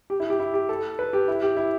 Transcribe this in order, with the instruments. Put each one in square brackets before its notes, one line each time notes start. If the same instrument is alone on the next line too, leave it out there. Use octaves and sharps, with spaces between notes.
[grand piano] G4
E4
G4
E4
G4
A4
B4
G4
E4
G4
E4